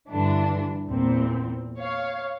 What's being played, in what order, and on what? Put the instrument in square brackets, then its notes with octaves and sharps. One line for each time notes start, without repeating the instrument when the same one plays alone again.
[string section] G2 D3 E3 D4
E2 A#2 C4
C#5 F5